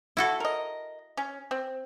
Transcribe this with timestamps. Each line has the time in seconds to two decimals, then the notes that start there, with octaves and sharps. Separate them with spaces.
0.17 E4 F#4 A4
0.40 A#4 D#5
1.17 C#4
1.51 C4